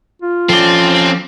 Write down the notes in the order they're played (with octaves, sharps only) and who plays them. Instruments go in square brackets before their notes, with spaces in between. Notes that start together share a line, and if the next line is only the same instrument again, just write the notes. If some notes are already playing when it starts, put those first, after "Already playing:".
[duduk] F4
[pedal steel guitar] F3 D5 [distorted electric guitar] C4 [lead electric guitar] C#4 A4